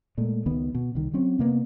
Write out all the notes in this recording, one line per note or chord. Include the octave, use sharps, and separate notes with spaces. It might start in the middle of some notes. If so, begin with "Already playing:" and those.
A#2 G#3 A3
C#2 D#3 B3
B2
C2 D#3
F#3 C4 C#4
C3 A#3 B3